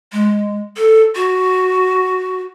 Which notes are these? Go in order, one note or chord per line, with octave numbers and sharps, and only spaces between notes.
G#3
A4
F#4